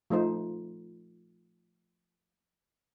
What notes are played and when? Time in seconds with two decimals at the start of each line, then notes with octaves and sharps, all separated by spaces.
0.10 F3 A3 D#4 C5